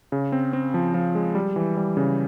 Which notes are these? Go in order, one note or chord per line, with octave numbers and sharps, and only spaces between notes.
C#3
C4
C4
F3
F3
G#3
G3
E3
G3
C#3